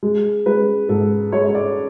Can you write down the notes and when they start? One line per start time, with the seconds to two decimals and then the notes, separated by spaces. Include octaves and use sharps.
0.03 G#3
0.46 G#3 B4
0.89 G#2 A4
1.32 G#3 C#5
1.49 C#5
1.55 D5